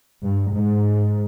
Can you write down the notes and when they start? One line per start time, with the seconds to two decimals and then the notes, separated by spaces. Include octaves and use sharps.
0.24 G2
0.53 G#2